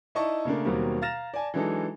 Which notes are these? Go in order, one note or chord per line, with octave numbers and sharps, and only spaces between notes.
D#4 E4 D5 D#5 A5 C#6
C#3 A3 A#3 D4
D#2 B2 F#3 G3 A#3 C4
F5 A#5 F6 A6 A#6 E7
D5 G#5 A5
E3 F#3 G#3 D4 D#4 A4